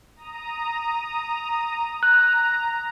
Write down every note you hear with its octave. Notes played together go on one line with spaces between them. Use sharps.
A#5 D#6
A#5 F#6